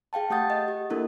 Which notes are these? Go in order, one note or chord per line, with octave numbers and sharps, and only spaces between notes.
G#4 F5 G5 A5
A3 G4 F#5 D#6 G6 A6
D#5
G4
A#3 D4 E4 A4 A#4